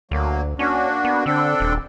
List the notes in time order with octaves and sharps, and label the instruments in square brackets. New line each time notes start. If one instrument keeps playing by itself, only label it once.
[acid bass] D2 [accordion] F#3 A#3
[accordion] A#3 D4 F#4 [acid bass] C#4
[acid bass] B3
[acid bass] D3 [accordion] C4 D4 A4
[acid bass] D#1